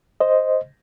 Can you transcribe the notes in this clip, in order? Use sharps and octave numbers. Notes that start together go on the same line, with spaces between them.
C5 D#5